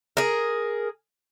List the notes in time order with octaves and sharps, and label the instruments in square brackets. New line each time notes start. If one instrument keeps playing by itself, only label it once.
[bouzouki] G#4 A#4